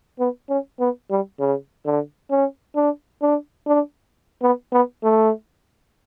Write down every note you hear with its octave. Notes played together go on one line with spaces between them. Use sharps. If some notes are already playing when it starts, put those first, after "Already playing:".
B3
C#4
B3
G3
C#3
D3
C#4
D4
D4
D4
B3
B3
A3